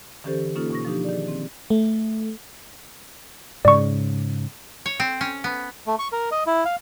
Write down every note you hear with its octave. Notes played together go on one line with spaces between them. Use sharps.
D3 E3 C#4 G4 A4 C5
A#3 C#4 D#4 F4 A4
B2 C#6 A#6
F3 D4 D#4 G4
D#3 G#4 D5
C4
A3
G#2 C#3 D5 C#6
C#5
C4
C#4
B3
A3
C#6
A#4
D#5
E4
F5